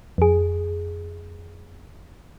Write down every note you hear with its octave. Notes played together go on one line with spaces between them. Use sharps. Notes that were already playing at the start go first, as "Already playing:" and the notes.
F2 G#4